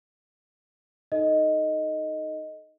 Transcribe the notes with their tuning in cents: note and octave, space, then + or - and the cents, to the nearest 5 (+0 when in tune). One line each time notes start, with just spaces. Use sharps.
D#4 +0 A4 -5 D#5 +0